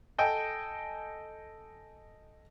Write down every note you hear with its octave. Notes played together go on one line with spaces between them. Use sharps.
A4 D#5 G5 G#5